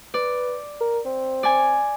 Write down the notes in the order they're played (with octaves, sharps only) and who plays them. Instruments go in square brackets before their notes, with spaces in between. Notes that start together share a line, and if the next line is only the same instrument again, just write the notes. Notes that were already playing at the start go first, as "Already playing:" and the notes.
[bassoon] B4 [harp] D5
[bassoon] A#4
C4
[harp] D5 G#5